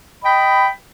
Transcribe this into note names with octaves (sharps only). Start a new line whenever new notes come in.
D#5 G5 B5